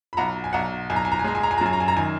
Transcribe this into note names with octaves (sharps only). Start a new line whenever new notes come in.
B5
B1 F#5 A#5
G#5
B1 F#5 A#5
B1 G#5
A#5
G#5
A#5
G#5
G#3 A#5
G#5
A#5
G#5
A#5
F#2 G#5
A#5
G#5
A#5
D#3 G#5